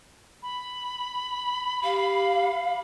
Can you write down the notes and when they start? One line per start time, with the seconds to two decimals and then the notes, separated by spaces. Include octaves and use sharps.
0.43 B5
1.84 G4 F5